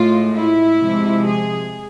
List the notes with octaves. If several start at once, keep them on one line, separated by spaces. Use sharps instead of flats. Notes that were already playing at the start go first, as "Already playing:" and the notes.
Already playing: A2 G#3 F4
E4
C3 F3 G#3
G#4